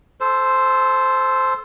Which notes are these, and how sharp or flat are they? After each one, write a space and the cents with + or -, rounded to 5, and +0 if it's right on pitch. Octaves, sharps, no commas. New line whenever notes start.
A4 -20 C5 +0 E6 +15